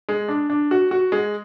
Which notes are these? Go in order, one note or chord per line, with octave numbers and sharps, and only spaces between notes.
G#3
D4
D4
F#4
F#4
G#3